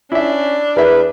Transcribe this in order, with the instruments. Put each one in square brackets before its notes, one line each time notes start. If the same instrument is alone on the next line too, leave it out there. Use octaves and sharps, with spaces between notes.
[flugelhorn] C#4 [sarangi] D4 [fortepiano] E4 E5
[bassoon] E2 [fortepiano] A#4 E5 [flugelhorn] B4